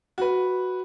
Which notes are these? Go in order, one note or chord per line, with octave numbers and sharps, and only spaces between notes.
F#4 B4